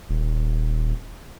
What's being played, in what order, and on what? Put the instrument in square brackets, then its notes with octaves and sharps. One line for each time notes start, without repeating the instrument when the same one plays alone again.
[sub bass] D#1